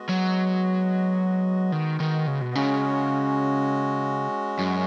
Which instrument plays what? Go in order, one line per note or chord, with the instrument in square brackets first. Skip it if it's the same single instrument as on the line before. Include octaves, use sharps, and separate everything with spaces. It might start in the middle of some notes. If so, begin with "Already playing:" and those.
Already playing: [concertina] G#3 B3 F#4 D#5
[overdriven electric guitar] F#3
D#3
D#3
C#3
B2
[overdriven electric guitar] C#3 [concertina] G#3 C#4 F#4
[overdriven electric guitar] F#2